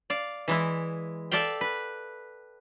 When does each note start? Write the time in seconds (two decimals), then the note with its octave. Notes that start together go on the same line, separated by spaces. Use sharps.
0.10 D5 F5
0.48 E3 G#3 E4
1.31 A4 D5 E5 F5 G5
1.61 B4